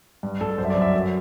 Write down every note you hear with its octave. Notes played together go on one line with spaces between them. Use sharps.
G2
G2 A4
F#2 C5
E5
D5
F#2
E5
F#2